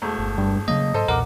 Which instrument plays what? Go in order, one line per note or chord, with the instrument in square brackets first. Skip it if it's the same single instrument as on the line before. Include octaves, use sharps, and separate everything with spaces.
[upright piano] E1 A3
[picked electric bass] G1
[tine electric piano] G2
[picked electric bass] C#3 F#3 A#3 [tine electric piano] D#5
[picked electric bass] G#2 [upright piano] A4 C5 D#5
[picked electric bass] B1 E2 A#2 [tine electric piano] A#4 [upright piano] F#5 D6